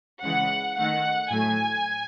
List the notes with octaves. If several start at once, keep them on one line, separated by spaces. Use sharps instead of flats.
C#3 E3 G#3 F#5
D#3 A3 F#5
A2 F#3 A3 G#5